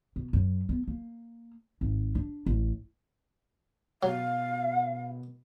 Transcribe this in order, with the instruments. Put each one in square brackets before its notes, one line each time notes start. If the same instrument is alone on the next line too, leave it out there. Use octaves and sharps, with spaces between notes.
[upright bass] B2
F#2
B3
A#3
G#1
D4
A1
[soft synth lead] B2 [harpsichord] F#3 [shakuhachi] F5